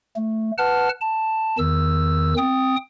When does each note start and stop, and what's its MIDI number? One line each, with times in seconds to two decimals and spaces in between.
0.16 0.51 57
0.58 0.89 71
0.58 0.89 78
0.58 0.89 81
0.58 0.89 89
1.01 1.57 81
1.59 2.34 40
1.59 2.34 51
1.59 2.34 88
2.38 2.76 60
2.38 2.76 79
2.38 2.76 87